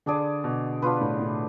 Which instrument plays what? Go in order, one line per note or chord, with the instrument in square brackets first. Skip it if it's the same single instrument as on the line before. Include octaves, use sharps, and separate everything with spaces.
[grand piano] D3 [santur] D4 G#4 D5
[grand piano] B2
[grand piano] B2 [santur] D4 F4 B4
[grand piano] A2
A2